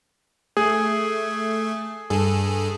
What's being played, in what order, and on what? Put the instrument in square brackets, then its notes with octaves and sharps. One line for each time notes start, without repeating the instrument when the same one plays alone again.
[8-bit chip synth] A3 [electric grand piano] G#4
[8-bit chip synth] G2 G#4 A4